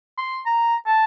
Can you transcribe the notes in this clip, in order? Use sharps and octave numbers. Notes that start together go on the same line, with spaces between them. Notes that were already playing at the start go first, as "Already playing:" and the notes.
C6
A#5
A5